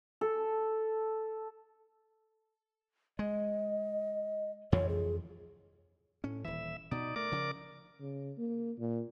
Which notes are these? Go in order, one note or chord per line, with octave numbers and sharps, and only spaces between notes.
A4
G#3 D#5
F2 E3 F3 C#5
G#4
A2 C#4
D#1 E3 E5
B2 D#4 D5
A3 A#4 D5 D6
C#3 F3
C#3
A#3
A#2